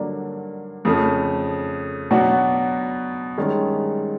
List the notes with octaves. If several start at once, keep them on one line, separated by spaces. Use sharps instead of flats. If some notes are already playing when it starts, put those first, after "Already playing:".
Already playing: G2 D3 F#3 A#3 D4
F2 C#3 F3 A3
B2 F#3 B3 D4 F#4
G2 D#3 G#3 C#4